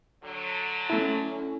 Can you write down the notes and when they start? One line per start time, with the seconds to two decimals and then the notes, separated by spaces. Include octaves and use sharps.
0.24 D3 F#3
0.90 A3 C#4 E4 A4